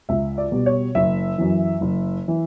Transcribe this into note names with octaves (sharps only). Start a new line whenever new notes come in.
C#2 E5
D5
B2 G3
C#5
F#1 E5
F#2 E3
F#1
E3